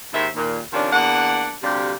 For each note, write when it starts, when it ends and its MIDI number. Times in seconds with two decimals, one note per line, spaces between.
0.13 0.27 39
0.13 0.27 44
0.13 0.27 51
0.13 0.27 72
0.13 0.27 76
0.35 0.59 39
0.35 0.59 46
0.73 0.91 48
0.73 0.91 51
0.73 0.91 53
0.73 0.91 61
0.73 0.91 62
0.91 1.52 40
0.91 1.52 58
0.91 1.52 62
0.91 1.52 78
1.62 1.93 38
1.62 1.93 48
1.62 1.93 55
1.62 1.93 62
1.62 1.93 67
1.62 1.93 77